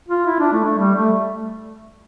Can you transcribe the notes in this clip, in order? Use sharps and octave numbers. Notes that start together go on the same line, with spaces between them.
F4
E4
D4
A3
A3
G3
A3